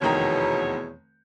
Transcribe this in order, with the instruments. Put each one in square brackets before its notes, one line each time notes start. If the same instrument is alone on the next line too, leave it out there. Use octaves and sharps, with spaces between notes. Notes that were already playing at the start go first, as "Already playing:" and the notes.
[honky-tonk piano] F1 D#3 A#5 [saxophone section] E2 B2 C#5